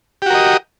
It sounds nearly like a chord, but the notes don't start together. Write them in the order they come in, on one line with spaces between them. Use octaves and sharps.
G4 F#4 A#4 D#5